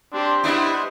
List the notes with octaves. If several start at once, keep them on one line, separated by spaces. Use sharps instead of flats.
C4 D4 G4 C5
G3 B3 D4 E4 D#5